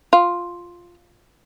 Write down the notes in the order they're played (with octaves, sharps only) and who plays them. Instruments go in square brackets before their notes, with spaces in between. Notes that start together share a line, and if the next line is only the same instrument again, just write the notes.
[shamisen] F4